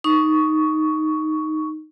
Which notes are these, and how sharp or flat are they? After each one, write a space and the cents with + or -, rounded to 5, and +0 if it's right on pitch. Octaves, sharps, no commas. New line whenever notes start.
D#4 +0 C#6 +10